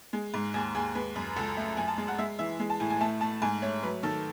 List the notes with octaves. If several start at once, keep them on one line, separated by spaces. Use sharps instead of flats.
G#3
G#2
D#2 G#4
D#2 G#4
G#3 B4
F#2
C#2 A4
A3
F#2 G#5
A5
G#3
F#5
G#3 E5
E3 E5
G#3
A5
A2 G#5
G#5
A3 A5
A3 A5
G#2 G#5
A3 C#5
F#3 B4
D#3 A4